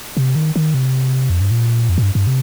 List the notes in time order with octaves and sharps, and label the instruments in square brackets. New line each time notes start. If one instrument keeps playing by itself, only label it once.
[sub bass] C3
D#3
D#3
C3
F2
G2
A#2
F2
A#2
G2
G2
C3